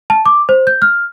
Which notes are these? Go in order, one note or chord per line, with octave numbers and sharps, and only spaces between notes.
A5
D6
C5
G6
F6